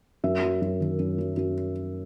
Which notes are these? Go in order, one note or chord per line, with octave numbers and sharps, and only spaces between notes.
F#2 E5
F#3
F#2
D#3
F#2
F#3
F#2